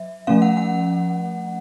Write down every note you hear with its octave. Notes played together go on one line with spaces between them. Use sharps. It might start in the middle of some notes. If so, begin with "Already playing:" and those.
Already playing: F#3 E5
F3 A3 C#4 F5
F#5
F#5